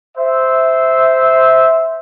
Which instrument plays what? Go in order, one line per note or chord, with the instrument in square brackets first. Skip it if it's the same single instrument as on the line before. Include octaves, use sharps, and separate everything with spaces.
[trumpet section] C5 E5